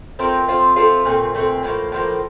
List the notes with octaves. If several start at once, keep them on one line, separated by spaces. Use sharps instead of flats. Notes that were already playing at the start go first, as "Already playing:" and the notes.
A3 C4 F4 A#4
A3 C4 F4 C5
A3 C4 F4 C5
A#2 A3 C4
A#2 A3 C4
A2 F3 A#3
A2 F3 A#3